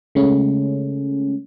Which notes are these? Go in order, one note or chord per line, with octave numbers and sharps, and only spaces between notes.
C#3 G#3 A3 C#4